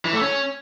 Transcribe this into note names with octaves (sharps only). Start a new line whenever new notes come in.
E3
A3
C#4